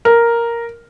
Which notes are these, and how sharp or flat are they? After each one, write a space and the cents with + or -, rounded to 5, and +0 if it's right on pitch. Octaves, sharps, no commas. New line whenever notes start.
A#4 +0